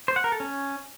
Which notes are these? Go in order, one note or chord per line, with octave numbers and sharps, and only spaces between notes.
C5
F#5
A#4
A4
C#4